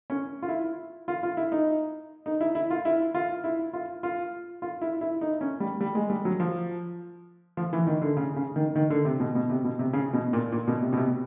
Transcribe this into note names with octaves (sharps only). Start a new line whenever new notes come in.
C#4
F4
E4
F4
F4
E4
D#4
D#4
E4
E4
F4
E4
F4
E4
F4
F4
F4
E4
E4
D#4
C#4
G3
G3
G#3
G3
F#3
F3
F3
E3
D#3
D3
C#3
C#3
D#3
D#3
D3
C3
B2
B2
C3
B2
C3
C#3
B2
A#2
A#2
B2
C3
B2
C3